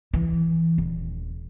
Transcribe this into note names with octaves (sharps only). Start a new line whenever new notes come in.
E3
D#1